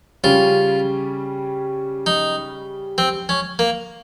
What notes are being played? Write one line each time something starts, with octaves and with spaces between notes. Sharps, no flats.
C#3 G3 C#4 F4
D#4
C4
C#4
A#3